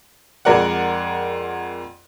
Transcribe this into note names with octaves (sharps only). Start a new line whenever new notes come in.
F2 G#3 A#4 D5 F#5